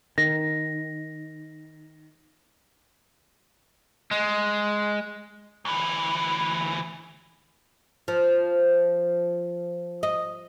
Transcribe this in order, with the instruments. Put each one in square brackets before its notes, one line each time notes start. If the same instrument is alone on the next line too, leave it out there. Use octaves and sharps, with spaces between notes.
[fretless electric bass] D#3 [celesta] A#6
[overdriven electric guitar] G#3
[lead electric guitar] D2 E3
[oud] F3
D#5